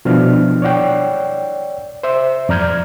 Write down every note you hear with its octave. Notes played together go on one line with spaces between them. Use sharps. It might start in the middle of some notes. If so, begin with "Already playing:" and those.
B2 F3 D4 E4 F6
C#5 D5 F#5 G5
C5 E5
F2 D5 A#5 F6 G6 G#6